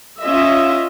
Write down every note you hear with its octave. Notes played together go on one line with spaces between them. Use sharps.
C#4 F4 D#5 E5